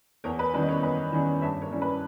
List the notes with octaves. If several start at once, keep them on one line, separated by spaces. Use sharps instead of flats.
E2 A#4 C#5
B4
D#3 G3 C#4 E4 B4
D#5
A#4 C#5
E2 B4 D#5
D#3 G3 C#4 E4
G2 C#5 E5
A#4 C#5
G3 C#4 E4
B4